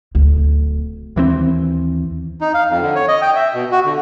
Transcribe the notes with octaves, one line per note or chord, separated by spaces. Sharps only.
D1 D2
D#2 E3 A#3 C4
D#4
F5
F2
D3
C#5
D#5
G5
E5
B2
F#4
D3